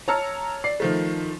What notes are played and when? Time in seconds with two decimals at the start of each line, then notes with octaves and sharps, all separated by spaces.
0.08 C#5 A5 A#5 E6 F6 C#7
0.64 D5 C7
0.80 D#3 F3 A3